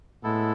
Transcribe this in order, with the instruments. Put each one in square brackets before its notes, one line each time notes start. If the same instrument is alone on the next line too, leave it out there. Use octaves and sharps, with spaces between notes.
[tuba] A2 [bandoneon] G#3 B3 E4 A4